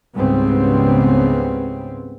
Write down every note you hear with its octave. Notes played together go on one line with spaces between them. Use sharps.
C#2 G#2 C#3 G3 B3 C4